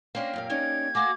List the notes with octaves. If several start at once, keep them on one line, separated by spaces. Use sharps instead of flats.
A#3 C#4 D4 G4 A#4 C5
F#2 A#2 F5
C#4 D#4 D5 G#6
A3 A#3 F#4 G#4 D6